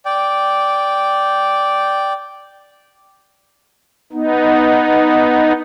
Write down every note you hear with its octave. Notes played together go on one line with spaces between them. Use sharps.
D5 G5
B3 D#4